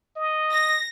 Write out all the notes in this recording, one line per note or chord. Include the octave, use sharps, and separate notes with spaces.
D#5
A#6